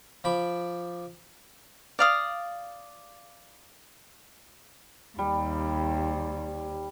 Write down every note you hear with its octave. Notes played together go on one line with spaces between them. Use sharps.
F3 B5 D6
D5 F5 D#6
D#2 G3